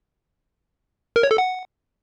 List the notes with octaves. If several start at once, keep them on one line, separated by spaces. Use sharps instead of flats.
A#4
C#5
A4
F#5